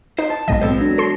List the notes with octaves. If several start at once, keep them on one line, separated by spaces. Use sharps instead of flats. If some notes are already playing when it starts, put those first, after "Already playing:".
D#4 C5
A5
B1 A2 F#3 G#3 B3 D#5
C4 A4 B4 C5
E3 F#3 D4
A4 C6